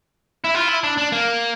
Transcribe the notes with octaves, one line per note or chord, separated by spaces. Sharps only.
E4
F4
E4
D4
D4
A#3